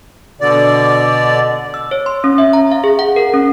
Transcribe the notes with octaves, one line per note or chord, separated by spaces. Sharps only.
B2 D3 D5
E6
C#5
C6
C#4
E5
A#5
F5
G#4
F#5
A#4
C#4